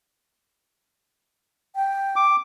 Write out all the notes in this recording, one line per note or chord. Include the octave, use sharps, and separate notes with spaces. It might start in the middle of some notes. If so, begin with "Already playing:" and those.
G5
D6